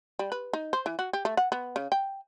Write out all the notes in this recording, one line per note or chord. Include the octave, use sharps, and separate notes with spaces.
G3
B4
D#4
C5
E3
F#4
G4
A3
F#5
B3
C#3
G5